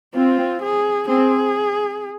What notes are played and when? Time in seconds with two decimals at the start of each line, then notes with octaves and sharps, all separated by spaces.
0.14 C4 F4
0.62 G#4
1.08 C4 G#4